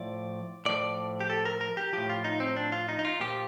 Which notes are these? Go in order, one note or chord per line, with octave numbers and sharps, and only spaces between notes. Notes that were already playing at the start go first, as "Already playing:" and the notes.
Already playing: A2 F3 D5
A2 F3 D5
G4
A4
A#4
A#4
G4
A2 F3 G4
F4
D#4
C4
D4
F4
D#4
D#4
F4
A#2 F3 G4